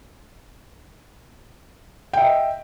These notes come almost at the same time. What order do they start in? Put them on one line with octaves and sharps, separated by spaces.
G5 E5 D#5